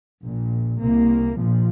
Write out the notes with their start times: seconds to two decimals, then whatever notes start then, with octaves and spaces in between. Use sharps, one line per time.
0.23 A#1 A#2
0.80 C2 C3 A#3
1.37 A#1 A#2 F3